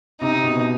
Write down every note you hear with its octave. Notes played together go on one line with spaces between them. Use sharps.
C3 D#4
B2
B2